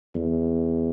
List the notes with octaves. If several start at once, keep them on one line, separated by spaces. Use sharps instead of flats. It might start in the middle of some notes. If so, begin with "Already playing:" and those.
E2